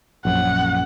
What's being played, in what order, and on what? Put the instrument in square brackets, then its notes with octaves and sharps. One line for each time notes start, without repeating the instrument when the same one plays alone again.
[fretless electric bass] A#1 F#2 [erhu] F#5